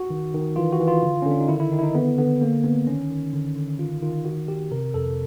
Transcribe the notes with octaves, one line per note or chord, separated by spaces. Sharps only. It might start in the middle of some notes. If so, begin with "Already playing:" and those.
Already playing: F#4
D#3
D#3
E3 F4
F#4
E3
F4
D3
D3 C#4
D4
D#4
D#3 E4
E4
D#3 D#4
E4
D#4
D3 B3
D3 B3
D3 A#3
D3 B3
D#3 C#4
D#3
D3
D3
D#3 F4
D#3 F4
D#3 F#4
D#3 G4
C3 A#4
F2 A4